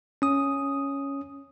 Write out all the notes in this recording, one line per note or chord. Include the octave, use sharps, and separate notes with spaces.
C#4 D#6